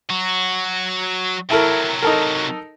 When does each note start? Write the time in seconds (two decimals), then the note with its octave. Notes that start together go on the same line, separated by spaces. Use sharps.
0.10 F#3 F#4
1.50 C3 F#3 E4 A4 A#4
2.02 D#4 A4 A#4